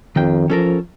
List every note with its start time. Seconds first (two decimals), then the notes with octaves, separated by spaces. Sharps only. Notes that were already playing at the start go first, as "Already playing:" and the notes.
0.16 F2 D#3 G5
0.50 F3 C#4 A4 A#4